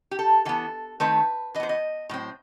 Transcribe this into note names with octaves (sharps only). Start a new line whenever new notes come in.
G4
A4
E3 B3 A4
D#3 A3 C4 B4
E3 D#5
B3 C5
D#5
A2 F#3 C4